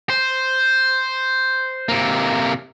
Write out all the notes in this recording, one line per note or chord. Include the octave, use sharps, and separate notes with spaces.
C5
C3 A#3